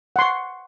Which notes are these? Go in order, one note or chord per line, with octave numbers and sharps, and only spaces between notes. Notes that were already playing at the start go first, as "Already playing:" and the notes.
F#5 C6 C#6